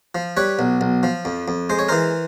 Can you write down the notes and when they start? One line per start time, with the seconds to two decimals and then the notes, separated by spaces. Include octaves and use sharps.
0.15 F3
0.37 G3 B4 C#5
0.59 B1
0.81 B1
1.03 F3
1.25 F2
1.48 F2
1.70 G#3 C5
1.79 C#5
1.89 E3 A#4 C5